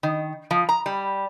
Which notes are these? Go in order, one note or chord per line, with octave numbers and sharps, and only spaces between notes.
D#3
F3
A#5
G3